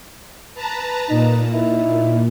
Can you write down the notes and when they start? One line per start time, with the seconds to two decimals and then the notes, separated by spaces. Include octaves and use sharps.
0.55 B4 A5 A#5
1.10 A#2 D#4
1.53 D#4 E4